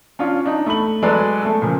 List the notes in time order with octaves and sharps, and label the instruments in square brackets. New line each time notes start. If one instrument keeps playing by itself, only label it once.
[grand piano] C#4 D4 F4
D4 D#4
A3 B5 F#7
F#3 G#3 A4 B4 D5
A3 A4
A#2 C#3 F3